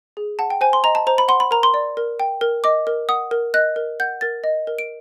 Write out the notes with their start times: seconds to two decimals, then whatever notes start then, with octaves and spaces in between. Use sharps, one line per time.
0.17 G#4
0.39 F#5 A5
0.50 G5
0.61 C5 G#5
0.73 C6
0.84 D#5 A#5
0.95 A5
1.07 C5 A#5
1.18 B5
1.28 F#5 C6
1.40 B5
1.51 A#4 A#5
1.63 C6
1.74 D5
1.97 A#4
2.20 G5
2.41 A#4
2.64 D#5 D6
2.87 A#4
3.09 F#5 D#6
3.31 A#4
3.54 D#5 F#6
3.76 A#4
4.00 F#5 G6
4.21 A#4 A6
4.44 D#5
4.67 A#4
4.79 D7